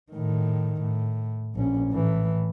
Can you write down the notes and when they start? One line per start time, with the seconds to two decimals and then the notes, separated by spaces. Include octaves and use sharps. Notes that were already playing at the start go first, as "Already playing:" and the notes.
0.12 A2 D#3
0.82 A2
1.55 A#1 C#4
1.91 A2 E3